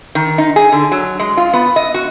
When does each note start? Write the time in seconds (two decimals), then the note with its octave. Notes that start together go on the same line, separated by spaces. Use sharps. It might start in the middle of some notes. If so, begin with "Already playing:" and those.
0.15 D#3
0.38 D#4
0.56 G#4
0.72 D3
0.92 F#3
1.20 G#3
1.37 F4
1.53 B3
1.76 D#5
1.94 F#4